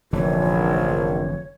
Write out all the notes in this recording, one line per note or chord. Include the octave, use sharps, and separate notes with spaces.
F1 A#1 D3 E3 C#5